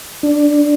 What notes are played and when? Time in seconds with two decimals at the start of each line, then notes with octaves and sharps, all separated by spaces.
0.23 D4